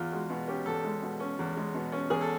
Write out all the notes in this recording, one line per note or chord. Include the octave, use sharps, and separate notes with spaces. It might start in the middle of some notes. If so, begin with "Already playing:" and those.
Already playing: E2 F4
G#3 F#4
B2
C#4 G4
E2 A4
G#3
B2
C#4
E2
G#3
B2
C#4
E2 G#4
A4